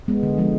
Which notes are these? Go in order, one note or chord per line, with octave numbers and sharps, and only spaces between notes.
G#3 B3
D3
F3 G#3